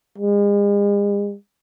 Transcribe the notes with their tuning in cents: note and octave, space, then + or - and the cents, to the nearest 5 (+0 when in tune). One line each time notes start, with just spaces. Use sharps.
G#3 -40